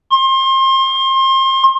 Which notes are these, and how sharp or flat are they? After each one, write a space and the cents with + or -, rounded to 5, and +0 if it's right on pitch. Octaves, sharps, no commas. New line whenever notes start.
C6 +30